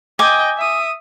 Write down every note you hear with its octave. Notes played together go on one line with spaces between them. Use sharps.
D#5 G5 G#5 D6
E5 D#6